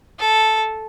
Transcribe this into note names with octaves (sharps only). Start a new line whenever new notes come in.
A4